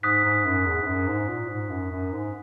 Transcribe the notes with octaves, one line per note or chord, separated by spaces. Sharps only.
G#2 D#6 F#6 B6
G#2
F#2
E2
G#2
F#2
G#2
A#2
G#2
F#2
F#2
G#2